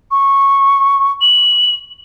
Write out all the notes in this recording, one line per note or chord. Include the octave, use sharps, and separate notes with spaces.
C#6
F#7